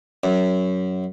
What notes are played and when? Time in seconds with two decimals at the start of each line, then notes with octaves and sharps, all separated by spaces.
0.24 F#2